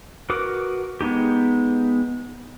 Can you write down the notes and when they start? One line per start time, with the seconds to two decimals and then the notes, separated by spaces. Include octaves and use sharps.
0.30 F#4 A#4 B4 D6 D#6
1.01 G#3 B3 D#4 G4